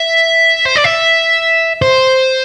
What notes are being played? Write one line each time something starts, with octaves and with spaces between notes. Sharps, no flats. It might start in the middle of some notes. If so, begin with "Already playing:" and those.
Already playing: E5
C5
D5
E5
C5